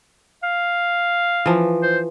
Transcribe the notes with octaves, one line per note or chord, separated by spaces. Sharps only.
F5
E3 F3
C5